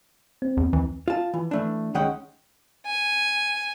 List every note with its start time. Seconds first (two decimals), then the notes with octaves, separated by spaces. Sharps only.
0.42 C4
0.57 E2
0.73 D#2 E3
1.08 F4 A5
1.34 E3
1.51 E3 A3 D4
1.94 C#2 D#3 G#3 C#4 F#5 G5
2.87 G#5